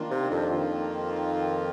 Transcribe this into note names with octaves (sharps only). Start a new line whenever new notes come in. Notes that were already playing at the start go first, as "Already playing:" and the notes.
Already playing: D#3 A#3 D4 F4
C3
F2
D#3 A#3 F4